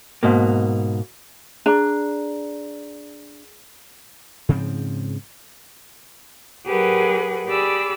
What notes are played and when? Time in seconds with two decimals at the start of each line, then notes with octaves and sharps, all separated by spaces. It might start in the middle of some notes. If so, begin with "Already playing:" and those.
0.23 G#2 B2 A#3
1.66 D4 G#4 A#5
4.49 G#2 C#3 F3 C4
6.67 F#3 G4 G#4 A#4 B4 F#5
7.47 G4 G#4 D5 B5 E6